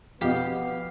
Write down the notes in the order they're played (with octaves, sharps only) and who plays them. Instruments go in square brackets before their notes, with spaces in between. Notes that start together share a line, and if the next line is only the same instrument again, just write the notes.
[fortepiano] F2 B2 D#5 [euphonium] B3 [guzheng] G4 [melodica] F5